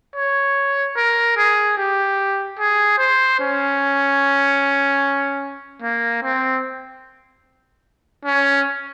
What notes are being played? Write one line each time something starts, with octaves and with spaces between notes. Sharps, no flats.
C#5
A#4
G#4
G4
G#4
C5
C#4
A#3
C4
C#4